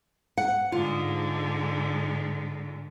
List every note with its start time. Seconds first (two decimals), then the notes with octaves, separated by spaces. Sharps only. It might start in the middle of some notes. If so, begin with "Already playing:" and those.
0.38 F#5
0.72 G#2 D3 F4